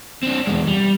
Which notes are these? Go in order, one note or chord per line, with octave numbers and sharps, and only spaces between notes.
C4 D4
E2 G#3
G3